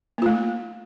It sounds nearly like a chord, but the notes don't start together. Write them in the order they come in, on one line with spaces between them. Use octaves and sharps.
A#3 F4 A3